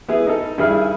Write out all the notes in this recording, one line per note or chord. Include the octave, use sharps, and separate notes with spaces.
B3 E4 G#4
D#4 A4
G2 D#3 E4 G#4 B5 F6